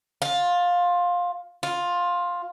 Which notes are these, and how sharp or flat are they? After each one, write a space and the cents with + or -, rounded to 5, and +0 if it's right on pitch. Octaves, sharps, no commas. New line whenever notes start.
F4 +15
F4 +10